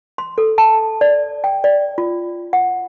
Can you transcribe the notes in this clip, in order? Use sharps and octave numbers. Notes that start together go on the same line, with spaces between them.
C6
A4
A5
D5
G5
D5
F4
F#5